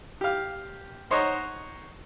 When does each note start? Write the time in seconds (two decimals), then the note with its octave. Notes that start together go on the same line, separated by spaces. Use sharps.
0.21 G4 F5
1.11 D#4 C5 C#5 D#5 F#5 A#5